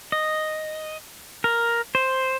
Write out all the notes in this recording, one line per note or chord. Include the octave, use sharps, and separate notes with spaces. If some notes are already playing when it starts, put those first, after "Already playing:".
D#5
A#4
C5